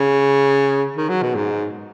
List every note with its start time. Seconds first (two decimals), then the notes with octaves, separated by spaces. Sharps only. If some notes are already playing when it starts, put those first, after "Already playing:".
Already playing: C#3
0.96 D#3
1.09 F#3
1.22 B2
1.35 G#2